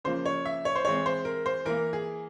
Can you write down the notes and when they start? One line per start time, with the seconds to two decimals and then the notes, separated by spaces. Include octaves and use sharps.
0.05 C#3 F3 A#3 C5
0.26 C#5
0.45 E5
0.65 C#5
0.75 C5
0.85 E3 G#3 C4 C#5
1.06 C5
1.25 A#4
1.46 C5
1.65 E3 A#3 A#4
1.93 G#4